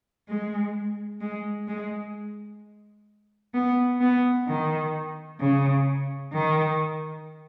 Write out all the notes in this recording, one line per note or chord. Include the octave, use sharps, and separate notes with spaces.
G#3
G#3
G#3
B3
B3
D#3
C#3
D#3